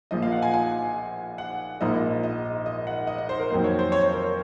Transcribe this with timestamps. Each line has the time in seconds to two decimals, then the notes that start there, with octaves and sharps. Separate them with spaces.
0.11 A#1 A#2 F3 D#5
0.22 F5
0.32 F#5
0.42 G#5
0.53 G#5
1.38 F#5
1.81 A#1 G#2 F3 A#3 D#5
2.23 D#5
2.66 D#5
2.87 F#5
3.07 D#5
3.18 D#5
3.29 C5
3.40 A#4
3.50 F2 D#3 F#3 A#3 C5
3.64 C#5
3.79 C5
3.92 C#5
4.03 C#5
4.14 A#4